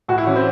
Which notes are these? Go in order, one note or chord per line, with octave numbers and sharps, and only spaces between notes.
A2 F#4
E4
E3 C#4
C4